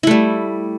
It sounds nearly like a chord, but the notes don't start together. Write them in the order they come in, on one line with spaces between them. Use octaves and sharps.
E4 A3 G3